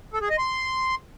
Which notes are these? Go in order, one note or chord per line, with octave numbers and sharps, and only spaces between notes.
A4
G#4
D#5
C6